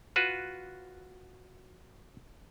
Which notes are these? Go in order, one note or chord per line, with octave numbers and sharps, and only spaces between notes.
F4 F#4 B4